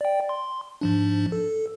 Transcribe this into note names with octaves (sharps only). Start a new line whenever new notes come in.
D5 G5
C6
G#2 F3 D4
A4